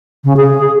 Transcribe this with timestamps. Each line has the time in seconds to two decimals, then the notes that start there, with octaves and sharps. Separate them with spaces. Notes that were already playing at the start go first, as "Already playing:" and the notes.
0.24 C#3
0.37 G#4